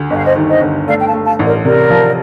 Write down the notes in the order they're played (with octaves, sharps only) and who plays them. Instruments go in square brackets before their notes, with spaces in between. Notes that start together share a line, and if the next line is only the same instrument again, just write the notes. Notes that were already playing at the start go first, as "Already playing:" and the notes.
Already playing: [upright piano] D2
[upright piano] G1 [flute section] D#5
[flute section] F5
C5 D#5
[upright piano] D#3
[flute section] C5 D#5
[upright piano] G1
[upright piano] A3 [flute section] D5 F5
[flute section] G5
F5 A5
[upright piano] A3
[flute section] F5 A5
[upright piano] A1
[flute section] A#4 D5
[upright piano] C3 [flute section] A#4 D5
[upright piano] F3